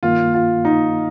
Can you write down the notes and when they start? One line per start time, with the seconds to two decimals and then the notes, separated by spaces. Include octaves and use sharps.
0.03 G2 D#3 A#3 F4
0.34 F4
0.65 D#4